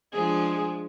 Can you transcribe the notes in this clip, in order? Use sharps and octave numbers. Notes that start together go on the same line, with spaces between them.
F3 G#3 D4 G#4